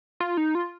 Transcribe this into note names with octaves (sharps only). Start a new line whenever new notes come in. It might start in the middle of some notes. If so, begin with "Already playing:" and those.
F4
D#4
F4